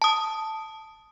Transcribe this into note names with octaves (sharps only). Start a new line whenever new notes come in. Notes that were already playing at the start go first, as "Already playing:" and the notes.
A5 D#6